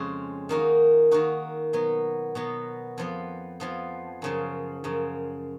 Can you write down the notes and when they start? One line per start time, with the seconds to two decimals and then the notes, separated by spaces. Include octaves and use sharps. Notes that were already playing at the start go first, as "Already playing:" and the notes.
Already playing: F2 C#3 G#3 C#4
0.49 D#3 A#3 D#4 F#4
1.11 D#3 A#3 D#4 F#4
1.73 B2 F#3 B3
2.35 B2 F#3 B3
2.98 F2 F3 B3
3.60 F2 F3 B3
4.22 F#2 C#3 F3
4.84 F#2 C#3 F3